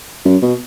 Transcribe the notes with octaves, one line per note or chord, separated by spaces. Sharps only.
F#2
B2